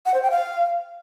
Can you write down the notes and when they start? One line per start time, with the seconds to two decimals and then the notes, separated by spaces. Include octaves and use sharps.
0.06 F#5
0.14 C5
0.22 G5
0.31 F5